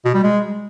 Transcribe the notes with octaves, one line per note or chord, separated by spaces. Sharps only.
B2
G3
G#3